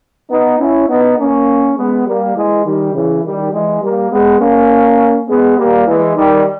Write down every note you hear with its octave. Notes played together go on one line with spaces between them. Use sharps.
B3 D#4
C#4 E4
B3 D#4
A#3 C#4
G#3 B3
G3 A#3
E3 G#3
D#3 G3
C#3 E3
D#3 G3
E3 G#3
G3 A#3
G#3 B3
A#3 C#4
G#3 B3
G3 A#3
E3 G#3
D#3 G3